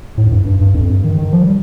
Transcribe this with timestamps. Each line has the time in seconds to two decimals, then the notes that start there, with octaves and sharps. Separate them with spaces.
0.18 A2
0.27 F2
0.32 G2
0.46 G2
0.61 G2
0.75 F2
0.89 G2
1.04 D#3
1.18 D#3
1.33 F3
1.42 G3